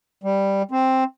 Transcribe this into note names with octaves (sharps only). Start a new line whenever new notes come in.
G3
C4